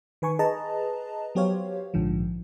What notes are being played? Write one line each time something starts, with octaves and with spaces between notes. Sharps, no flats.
D#3 B4 G#5 C#6
G#4 B4 D#5 A5 A#5
F#3 B3 G4 C5 C#5 F5
A#1 G#2 D3 F3